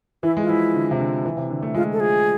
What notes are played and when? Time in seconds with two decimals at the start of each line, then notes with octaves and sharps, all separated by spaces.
0.23 E3 E4
0.37 G#3
0.43 F4
0.49 F3 E4
0.74 D3
0.91 C3
1.00 D3
1.25 E3
1.37 C3
1.50 D3
1.63 A3
1.74 G#3 F4
1.93 A4
2.00 F3 G#4